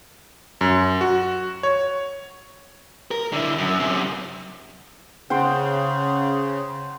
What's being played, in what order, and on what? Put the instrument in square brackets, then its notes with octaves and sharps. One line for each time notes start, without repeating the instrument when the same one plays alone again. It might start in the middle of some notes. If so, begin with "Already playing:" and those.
[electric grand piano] F#2
F#4
C#5
[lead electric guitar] A#4
D3 E4
F#2
F#2 C3
[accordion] C#3 [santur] C5 F#5 G5